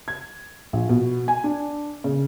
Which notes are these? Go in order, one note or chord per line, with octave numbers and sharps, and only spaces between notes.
G#6
A#1
B2
G#5
D4
C#3